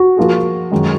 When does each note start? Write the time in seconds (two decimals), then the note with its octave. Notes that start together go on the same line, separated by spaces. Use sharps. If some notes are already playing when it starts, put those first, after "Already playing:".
Already playing: F#4
0.17 F3 A#3 F4 G#4
0.72 F#2 D#3 G#3 D#4